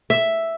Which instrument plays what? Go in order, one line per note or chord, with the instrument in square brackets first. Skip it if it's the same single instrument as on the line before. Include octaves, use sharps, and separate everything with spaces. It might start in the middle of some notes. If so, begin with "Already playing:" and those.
[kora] E5